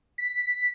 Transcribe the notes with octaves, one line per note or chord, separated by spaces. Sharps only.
B6